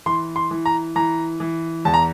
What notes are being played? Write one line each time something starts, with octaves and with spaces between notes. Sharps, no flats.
E3 C6
C6
E3
A#5
E3 A#5
E3
E2 A5
A#5